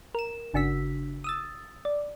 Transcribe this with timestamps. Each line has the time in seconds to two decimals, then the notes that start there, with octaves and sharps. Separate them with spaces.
0.15 A#4 E7
0.54 G1 C#3 D4 F#4 E6 B6
1.24 D#6 E6 A6
1.85 D5